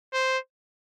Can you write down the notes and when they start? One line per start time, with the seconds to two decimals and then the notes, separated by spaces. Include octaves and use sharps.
0.13 C5